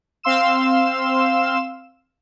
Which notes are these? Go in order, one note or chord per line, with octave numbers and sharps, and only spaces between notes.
C4 F5 C6 E6 E7